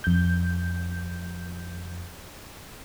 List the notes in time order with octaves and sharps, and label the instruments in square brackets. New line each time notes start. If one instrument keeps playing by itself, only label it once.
[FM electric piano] F2 G6